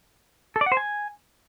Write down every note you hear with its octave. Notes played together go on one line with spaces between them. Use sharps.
A4
D5
F#5
C5
G#5